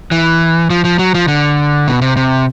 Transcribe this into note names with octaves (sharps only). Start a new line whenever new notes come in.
E3
F3
F3
F#3
F3
D3
B2
C3
C3